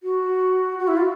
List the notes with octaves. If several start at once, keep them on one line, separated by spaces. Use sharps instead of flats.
F#4
F#4
E4
F4